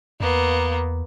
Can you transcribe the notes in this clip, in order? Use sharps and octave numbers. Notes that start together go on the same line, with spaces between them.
E2 A#3 B3